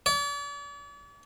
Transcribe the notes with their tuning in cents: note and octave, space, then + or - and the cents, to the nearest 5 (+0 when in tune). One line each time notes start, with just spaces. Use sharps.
D5 -45